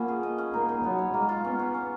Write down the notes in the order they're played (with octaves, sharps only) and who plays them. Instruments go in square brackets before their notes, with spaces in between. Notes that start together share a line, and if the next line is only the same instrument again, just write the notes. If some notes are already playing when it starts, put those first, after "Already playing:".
Already playing: [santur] F3 B3 C#4 [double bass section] A#3
[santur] G#4
D#5
C#4
[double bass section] A#3 [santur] D#4
[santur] D#4
[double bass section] F#3 [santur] B3
[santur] C#5
[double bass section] G#3 [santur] A#3
[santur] F4
[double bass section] B3 [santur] C#4
[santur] C#4
C#4